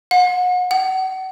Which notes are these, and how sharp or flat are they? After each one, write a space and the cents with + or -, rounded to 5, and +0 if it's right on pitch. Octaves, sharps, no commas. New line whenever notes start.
F#5 -35
F#5 +35